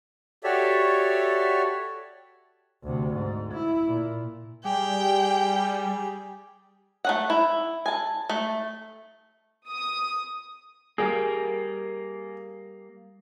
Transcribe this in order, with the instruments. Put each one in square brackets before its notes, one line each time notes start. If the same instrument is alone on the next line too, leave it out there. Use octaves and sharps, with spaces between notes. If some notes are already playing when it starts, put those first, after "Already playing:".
[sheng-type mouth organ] F#4 G4 A4 C#5 D5 E5
[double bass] D2 C3
G#2
E4
A#2
[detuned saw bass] G3 [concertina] G4 G#4 [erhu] G5
[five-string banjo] A3 C#4 F#5
E4
G#5 A5
A3
[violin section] D#6
[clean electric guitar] G3 A#3 [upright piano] G#4